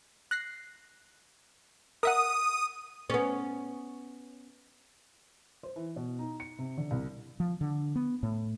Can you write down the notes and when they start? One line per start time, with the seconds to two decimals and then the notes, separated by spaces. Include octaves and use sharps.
0.31 F#6 A#6 C7
2.03 A#4 E5 F#5 D#6
3.10 B3 C#4
5.63 C5
5.76 E3
5.96 B2
6.19 D#4
6.40 C#7
6.59 C3
6.77 D3
6.91 C2
7.40 F3
7.61 D3
7.96 B3
8.23 A2